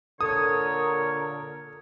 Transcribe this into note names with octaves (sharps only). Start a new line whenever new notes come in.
A#2 D3 A4 A#4 C#5 D#6